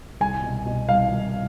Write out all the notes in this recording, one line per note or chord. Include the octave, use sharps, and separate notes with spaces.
C2 G#5
B2
B2
C2 F5
C2